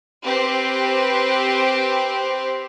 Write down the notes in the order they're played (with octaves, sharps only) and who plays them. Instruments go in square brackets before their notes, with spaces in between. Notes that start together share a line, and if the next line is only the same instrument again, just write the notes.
[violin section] C4 G4 B4 C5